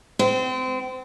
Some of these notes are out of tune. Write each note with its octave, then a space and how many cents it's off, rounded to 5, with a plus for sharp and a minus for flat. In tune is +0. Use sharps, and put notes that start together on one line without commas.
C4 -30